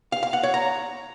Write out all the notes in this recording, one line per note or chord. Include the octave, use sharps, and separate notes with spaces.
F5
F5
F#5
C#5
A#5